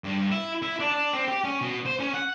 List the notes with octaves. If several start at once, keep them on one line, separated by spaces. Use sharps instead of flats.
G2
E4
E4
D4
D4
C4
G4
C#4
B2
C5
C#4
F#5